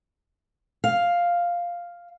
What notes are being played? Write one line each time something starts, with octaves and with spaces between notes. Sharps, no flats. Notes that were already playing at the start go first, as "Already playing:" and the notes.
F5